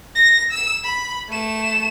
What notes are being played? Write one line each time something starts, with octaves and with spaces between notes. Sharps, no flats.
A#6
E6 E7
B5
A3 E7